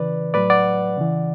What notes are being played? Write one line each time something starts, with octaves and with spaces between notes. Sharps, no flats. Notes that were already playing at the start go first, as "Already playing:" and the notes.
Already playing: C#3 E3 B4 D5
A2 F#3 B4 D5
D5 F#5
C#3 E3